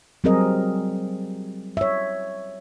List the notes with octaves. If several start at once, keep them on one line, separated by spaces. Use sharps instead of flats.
F#3 G3 C4 G#4 A#4 D#5
C#5 E5